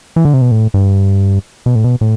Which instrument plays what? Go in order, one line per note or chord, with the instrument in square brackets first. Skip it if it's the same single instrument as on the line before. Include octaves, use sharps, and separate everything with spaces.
[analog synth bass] E3
D3
C3
B2
A2
G2
B2
A2
B2
A2